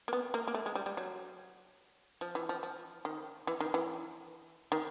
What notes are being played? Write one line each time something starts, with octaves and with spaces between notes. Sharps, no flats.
A#3
B3
A#3
A#3
A3
G#3
G3
G3
F#3
F3
E3
F3
F3
D#3
E3
D#3
E3
D#3